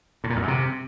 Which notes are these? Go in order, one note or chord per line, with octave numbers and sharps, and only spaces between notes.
A2
A#2
F2
F#2
C3